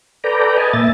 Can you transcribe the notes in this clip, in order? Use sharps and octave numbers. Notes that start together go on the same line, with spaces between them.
A4 B4 D5 G5 A#5
B4 D#5 G#5 A5
A#2 E5 A6